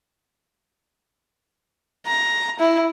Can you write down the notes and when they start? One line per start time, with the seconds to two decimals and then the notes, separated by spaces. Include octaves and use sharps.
2.07 A#5
2.60 E4